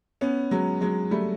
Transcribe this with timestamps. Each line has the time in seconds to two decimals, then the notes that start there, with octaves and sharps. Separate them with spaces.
0.21 B3 C#4
0.51 F#3 G#3
0.81 F#3 G#3
1.11 G3 A3